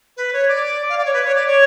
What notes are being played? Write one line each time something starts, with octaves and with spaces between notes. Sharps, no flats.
B4
C#5
D5
F5
D5
C#5
B4
C#5
D5
C#5